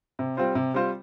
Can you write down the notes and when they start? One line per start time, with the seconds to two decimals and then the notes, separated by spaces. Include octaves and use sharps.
0.19 C3
0.37 G3 C4 F4 C5
0.55 C3
0.74 G3 C4 F4 C5